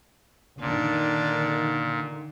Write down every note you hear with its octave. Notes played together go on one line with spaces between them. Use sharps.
A#2 D3 D#3 D4